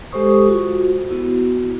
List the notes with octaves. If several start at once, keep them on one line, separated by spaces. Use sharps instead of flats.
G#3 G4 A4 C5 C#6 D#6
F4 F#4
B3 E4 F#4